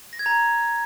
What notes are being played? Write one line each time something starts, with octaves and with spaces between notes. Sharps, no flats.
A#6
G#6
A#5